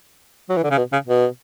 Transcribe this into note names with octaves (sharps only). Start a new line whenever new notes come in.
F#3
E3
D3
C#3
B2
C#3
B2